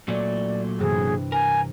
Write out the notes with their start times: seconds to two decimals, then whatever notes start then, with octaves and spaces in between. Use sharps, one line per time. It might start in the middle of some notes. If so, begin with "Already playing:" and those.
0.08 A#2 F#3 A3 D5
0.79 G2 C3 E3 G#4
1.32 A#4 G#5